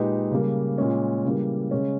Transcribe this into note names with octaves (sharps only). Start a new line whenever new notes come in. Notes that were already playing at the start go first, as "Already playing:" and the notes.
Already playing: A#2 G#3 D#4 G4 B4
C#3 G3 A#3
A#2 G#3 C#4
C#3 E3 G3 A#3
C#3 G#3 C#4